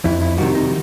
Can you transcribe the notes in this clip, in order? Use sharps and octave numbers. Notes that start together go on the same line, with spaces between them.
F2 E4
E4
C3 D#3 G3 F#4
D#4